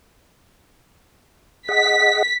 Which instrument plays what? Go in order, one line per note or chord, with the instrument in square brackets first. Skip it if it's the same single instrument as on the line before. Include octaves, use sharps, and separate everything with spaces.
[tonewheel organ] G#4 D#5 F#5 [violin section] B6